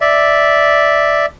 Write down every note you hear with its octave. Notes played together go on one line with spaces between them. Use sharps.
D5 E5